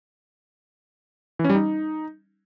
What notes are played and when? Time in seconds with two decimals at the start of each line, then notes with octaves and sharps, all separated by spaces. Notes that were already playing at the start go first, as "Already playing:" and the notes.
1.39 E3
1.44 C#4
1.50 G3
1.55 D#4